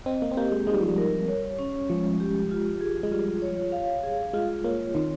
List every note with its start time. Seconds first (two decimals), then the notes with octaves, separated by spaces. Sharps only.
0.06 C4 D#5
0.22 A#3
0.31 C4
0.37 A#3 G4
0.52 G#3
0.67 G#3 D#4
0.74 G3
0.81 F3
0.88 G3
0.98 A#4
1.28 C#5
1.59 C#4
1.90 F3 G#3
2.20 G4
2.51 F4
2.81 G#4
3.03 G#3
3.11 G3 F4
3.42 C#5
3.72 F5
4.03 G#4
4.33 G#3 F4
4.64 A#3 C#5
4.95 D#3 C4